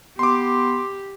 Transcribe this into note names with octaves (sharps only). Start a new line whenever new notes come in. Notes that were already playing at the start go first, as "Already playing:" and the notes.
B3 G4 C6 D6